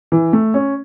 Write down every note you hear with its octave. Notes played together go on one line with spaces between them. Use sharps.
E3
A3
C#4